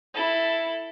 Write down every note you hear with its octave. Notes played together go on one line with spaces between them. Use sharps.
E4 A4